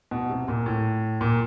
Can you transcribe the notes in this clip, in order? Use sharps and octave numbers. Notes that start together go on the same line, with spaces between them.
B2
C3
A#2
A2
A#2